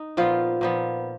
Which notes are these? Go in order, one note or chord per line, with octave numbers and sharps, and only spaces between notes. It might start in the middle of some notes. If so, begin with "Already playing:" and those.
Already playing: D#4
A#2 F3 B3 F4
A#2 F3 B3